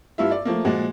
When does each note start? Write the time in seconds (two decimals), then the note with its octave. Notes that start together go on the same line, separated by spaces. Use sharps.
0.18 G2 E4 F4 E5
0.31 D5
0.45 F3 A3 A#3
0.65 A#2 F3 G#3 F#4